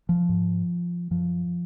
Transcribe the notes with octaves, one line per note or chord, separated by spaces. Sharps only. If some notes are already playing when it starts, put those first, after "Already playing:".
F3
G#2
F#2 F3